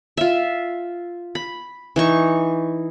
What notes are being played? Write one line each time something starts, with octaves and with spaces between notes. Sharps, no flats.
F4 E5
B5
E3 D#4 C#6